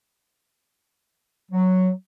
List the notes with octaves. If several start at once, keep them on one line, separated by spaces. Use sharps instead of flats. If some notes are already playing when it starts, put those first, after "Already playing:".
F#3